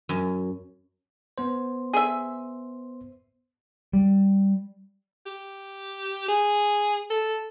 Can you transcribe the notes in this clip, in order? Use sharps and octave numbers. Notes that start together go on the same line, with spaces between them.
F#2
B3 C5
G#4 E5
G3
G4
G#4
A4